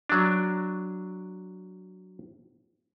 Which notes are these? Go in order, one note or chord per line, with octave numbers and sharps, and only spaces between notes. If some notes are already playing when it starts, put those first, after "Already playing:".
F#3 D4